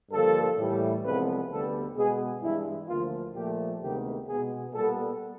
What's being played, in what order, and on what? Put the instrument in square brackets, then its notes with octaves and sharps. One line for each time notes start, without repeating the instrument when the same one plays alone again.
[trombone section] G2 D3 F3 A#3 A4
A2 E3 G3
C2 C3 F3 G#3 B3 B4
D2 D3 G3 B3 A4
B2 G#3 B3 G#4
G2 E3 G#3 E4
D2 D3 F3 A#3 F4
A#2 F3 A3 G4
D2 C3 D#3 G#3 B3 G4
B2 G#3 B3 G#4
A#2 G3 B3 A4